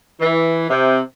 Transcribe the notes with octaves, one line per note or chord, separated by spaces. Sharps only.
E3
C3